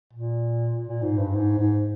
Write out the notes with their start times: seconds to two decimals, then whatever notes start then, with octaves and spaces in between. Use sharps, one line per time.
0.13 A#2
0.87 A#2
1.02 G#2
1.19 G2
1.35 G#2
1.59 G#2